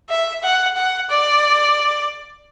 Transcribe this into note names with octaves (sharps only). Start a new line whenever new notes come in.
E5
F#5
F#5
D5